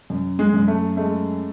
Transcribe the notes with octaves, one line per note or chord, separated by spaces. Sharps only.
F#2
G#3
F#2
A3
G#3 A3